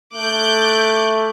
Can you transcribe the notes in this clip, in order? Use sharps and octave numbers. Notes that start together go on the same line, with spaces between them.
A3 D6 F#6 G6